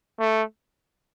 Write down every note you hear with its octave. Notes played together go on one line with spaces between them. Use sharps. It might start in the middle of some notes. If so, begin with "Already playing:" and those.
A3